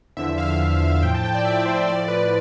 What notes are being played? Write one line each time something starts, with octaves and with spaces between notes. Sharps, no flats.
E2 D3 F3 E5
F5
E2 D3 F3
A2 F3 G5
A5
G5
D5
A2 F3 E5
C5
A2 F3 D5
B4